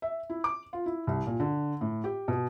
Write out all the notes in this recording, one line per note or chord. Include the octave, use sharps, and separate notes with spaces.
E5
E4
D6
F4
E4
C2
A#2
D3
A2
G4
B2